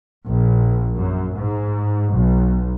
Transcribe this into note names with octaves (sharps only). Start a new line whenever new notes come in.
A#1
F#2
G#2
B1